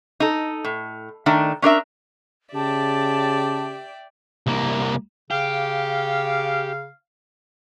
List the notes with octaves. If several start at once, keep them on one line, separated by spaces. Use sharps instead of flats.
D#4 A4
A2
D#3 A3 D4
C#4 D4 A#4 E5
C#3 G4 D5 E5 G5 A5
C2 A#3
C#3 G4 F5